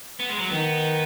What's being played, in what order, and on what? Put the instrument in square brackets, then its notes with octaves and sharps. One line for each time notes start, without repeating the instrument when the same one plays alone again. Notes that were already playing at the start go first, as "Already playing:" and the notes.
[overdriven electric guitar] B3
G#3
F#3
[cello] D#3 [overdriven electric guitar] B3